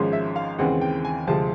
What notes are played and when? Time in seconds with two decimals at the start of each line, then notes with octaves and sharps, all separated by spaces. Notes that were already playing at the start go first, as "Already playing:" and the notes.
Already playing: G#1 G#2 F3 G#3 C#4
0.13 E5
0.36 F5
0.59 D#2 C#3 E3 G#3 C4 F#5
0.81 G5
1.05 G#5
1.27 D2 C3 F3 G#3 C4 A5